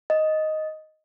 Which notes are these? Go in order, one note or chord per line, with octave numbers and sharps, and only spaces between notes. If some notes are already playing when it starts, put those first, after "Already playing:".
D#5